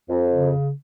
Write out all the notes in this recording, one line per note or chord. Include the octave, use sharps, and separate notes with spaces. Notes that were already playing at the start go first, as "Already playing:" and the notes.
F2
C#3